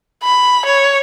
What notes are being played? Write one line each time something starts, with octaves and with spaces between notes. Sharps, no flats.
B5
C#5